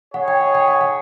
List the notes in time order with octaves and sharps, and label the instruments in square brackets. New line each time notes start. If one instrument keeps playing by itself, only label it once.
[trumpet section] D#4 G#4 C#5 [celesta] F#5
[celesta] G5
F#5
G5
F#5
F#5